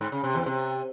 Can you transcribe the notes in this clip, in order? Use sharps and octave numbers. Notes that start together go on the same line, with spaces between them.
G#2
C#3
C3
E2
C3